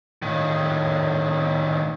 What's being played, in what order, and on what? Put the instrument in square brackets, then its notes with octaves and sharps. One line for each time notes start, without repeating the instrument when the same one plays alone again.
[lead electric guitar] A2 D#3